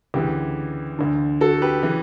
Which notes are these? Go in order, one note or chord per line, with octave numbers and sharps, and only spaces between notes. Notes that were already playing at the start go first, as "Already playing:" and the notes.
D2 C#3 E3 G4
D2 D3
F#4 A4
G4 B4
C#3 E3